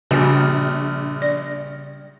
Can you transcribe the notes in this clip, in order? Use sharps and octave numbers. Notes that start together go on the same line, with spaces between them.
A#1 C#3 G3 F#4 F6
D5